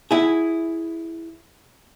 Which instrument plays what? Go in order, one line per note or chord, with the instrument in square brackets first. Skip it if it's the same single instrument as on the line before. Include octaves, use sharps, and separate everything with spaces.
[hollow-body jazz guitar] E4 G#4